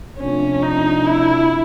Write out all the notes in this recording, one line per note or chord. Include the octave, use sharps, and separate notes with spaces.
F2 C3 F3 A3 C#4 D4
D#4
E4